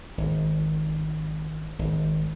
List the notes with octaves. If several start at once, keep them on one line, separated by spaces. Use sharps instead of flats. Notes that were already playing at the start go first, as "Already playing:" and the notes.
G#1
G#1